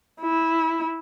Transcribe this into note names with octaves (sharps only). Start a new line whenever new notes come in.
E4